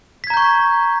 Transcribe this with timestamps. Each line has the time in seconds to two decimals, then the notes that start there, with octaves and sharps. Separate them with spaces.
0.24 B6
0.27 G#6
0.30 A#5
0.34 G6
0.37 C#6